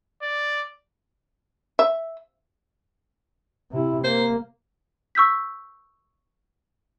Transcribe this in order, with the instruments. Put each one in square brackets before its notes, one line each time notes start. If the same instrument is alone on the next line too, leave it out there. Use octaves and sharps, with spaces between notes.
[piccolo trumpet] D5
[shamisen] E5
[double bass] C3 E4
[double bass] A#3 [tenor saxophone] C5
[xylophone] C#6 E6 G6 B6